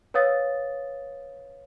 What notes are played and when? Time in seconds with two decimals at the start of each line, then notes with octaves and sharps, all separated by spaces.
0.14 B4 C#5 F5 D#6 A6